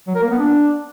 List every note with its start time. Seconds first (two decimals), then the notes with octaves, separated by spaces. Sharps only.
0.07 F#3
0.15 A#4
0.23 A#3
0.31 B3
0.39 D4